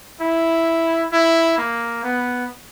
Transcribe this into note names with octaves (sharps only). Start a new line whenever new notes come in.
E4
E4
A#3
B3